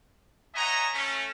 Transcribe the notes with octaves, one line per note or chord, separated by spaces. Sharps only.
C#5 D#5 E5 F#5 G#5 A#5
A3 C#4